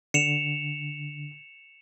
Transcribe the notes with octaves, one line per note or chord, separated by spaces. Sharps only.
D3 C#7 E7 F7